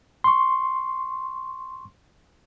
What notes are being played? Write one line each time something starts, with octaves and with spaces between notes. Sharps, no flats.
C6 C#6